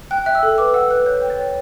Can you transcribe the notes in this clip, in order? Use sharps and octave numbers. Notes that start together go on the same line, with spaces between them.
G5 F#6
E5 F#6
E6
A4
B4 D6
F#5 E6
B4 F#6
C#5 G6
G5
A6
C#5